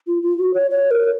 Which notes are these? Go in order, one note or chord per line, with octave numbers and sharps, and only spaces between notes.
F4
F4
F#4
C#5
C#5
A#4